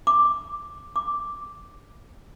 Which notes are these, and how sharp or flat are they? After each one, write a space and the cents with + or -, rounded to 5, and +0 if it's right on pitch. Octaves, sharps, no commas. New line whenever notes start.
D6 +5
D6 +0